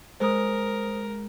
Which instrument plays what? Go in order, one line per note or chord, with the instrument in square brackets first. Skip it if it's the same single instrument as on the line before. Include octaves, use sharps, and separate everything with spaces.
[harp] G#3 [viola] A#4 [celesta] C5 D#6